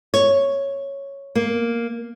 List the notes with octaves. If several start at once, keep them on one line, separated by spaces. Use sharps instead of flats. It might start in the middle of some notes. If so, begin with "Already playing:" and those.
C#5
A#3